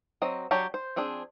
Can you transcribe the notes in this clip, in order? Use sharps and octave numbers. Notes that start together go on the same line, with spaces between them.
F#3 C4 D#5
F#3 D4 G4 C#5 A5
C5
F3 C4 D4 G#4